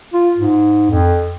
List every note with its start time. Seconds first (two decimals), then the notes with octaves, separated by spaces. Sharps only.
0.13 F4
0.38 G#2
0.91 F2